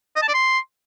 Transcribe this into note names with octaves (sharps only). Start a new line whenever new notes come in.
D#5
A5
D5
C6